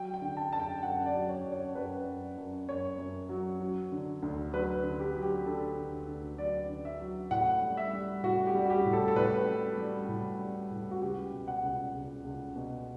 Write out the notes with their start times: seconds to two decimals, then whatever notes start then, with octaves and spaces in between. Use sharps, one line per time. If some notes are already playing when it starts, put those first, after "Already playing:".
Already playing: F#3 G5
0.14 G5
0.22 D3
0.37 A5
0.52 F#2 A5
0.60 G5
0.83 F#2 F#5
1.06 D5
1.14 F#3
1.29 C#5
1.45 F#2
1.52 C#5
1.75 F#2 B4
2.06 F#2
2.37 F#2
2.68 F#2 C#5
2.99 F#2
3.29 F#3
3.60 F#3
3.92 D3
4.22 D2
4.53 F#3 B4
4.83 D3
4.99 G4
5.15 F#3
5.23 G4
5.46 D3 A4
5.76 D2
6.08 D2
6.38 F#3 D5
6.69 D3
6.85 E5
7.00 F#3
7.31 A2 F#5
7.62 G3
7.77 E5
7.93 G3
8.24 A2 F#4
8.47 G4
8.55 G3
8.66 F#4
8.70 G4
8.86 A2
8.93 A4
9.08 A4
9.16 A2 B4
9.47 G3
9.78 G3
10.09 A2
10.39 G3
10.71 A2
10.91 F#4
11.01 C#2 G4
11.33 B2
11.48 F#5
11.63 C#2
11.94 C#2
12.25 C#2
12.56 B2